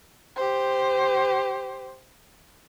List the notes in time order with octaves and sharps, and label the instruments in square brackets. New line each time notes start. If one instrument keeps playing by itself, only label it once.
[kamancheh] G4 C5